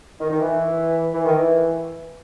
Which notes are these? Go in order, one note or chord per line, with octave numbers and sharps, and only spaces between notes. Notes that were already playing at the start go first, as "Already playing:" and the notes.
D#3
D#3
E3
E3
D#3
E3